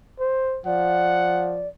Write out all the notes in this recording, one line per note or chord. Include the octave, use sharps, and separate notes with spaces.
C5
F3 D5 F#5